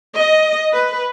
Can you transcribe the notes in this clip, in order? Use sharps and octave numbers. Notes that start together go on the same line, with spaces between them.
D#5
B4